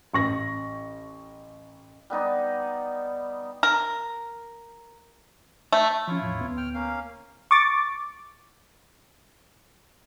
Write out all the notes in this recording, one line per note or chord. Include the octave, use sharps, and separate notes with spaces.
A1 C#6 A#6
G3 B3 D#4 D5
A#4
A3
F3 C#4 E4 F4 C#5
E2 A2
D2 B3
G5 F6
A#3 C#4 F5
C#6 D6 A6